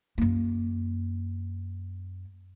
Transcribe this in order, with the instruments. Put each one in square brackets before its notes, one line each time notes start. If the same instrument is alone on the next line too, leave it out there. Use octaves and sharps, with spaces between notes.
[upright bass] F#2 A#3